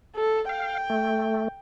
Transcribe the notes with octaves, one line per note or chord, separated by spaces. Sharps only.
A4
F5 G5
A3